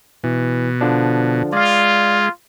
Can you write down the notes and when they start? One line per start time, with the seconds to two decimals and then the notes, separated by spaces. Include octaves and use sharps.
0.24 B2 E3
0.81 D3 F3 D4
1.53 G#3 F4 D5 F5